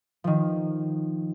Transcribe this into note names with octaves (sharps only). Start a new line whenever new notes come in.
D#3 F3